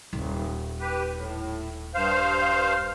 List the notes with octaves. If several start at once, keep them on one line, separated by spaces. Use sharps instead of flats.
D#1
G4 B4
A2
G2 C5 F5